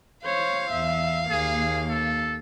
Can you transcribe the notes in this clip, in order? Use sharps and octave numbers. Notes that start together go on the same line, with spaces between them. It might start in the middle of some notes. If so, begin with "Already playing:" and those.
C5 C#5 F5
E2 E5
D#2 A#3 G#4
A4